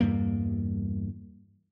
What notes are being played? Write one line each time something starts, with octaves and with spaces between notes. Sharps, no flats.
E2 G2 G3 A#3